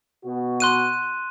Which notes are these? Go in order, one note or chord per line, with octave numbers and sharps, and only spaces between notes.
B2 F#4
C6 F#6 D#7